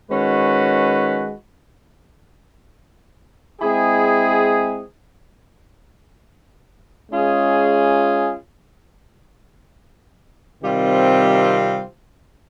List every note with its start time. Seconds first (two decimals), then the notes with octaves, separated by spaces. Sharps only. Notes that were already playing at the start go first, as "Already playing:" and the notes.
0.10 D#3 G#3 C#4 F#4 B4
3.61 G#3 C4 E4 G#4
7.11 G#3 C#4 F4 G#4
10.61 C3 D#3 G3 C4 F4